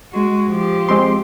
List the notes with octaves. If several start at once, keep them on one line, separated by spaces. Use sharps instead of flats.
G#3 F#4
F3 G4
G#3 C4 C6